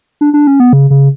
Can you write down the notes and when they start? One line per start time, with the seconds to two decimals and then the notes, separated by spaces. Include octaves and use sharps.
0.21 D4
0.34 D4
0.47 C#4
0.60 B3
0.73 C#3
0.90 C#3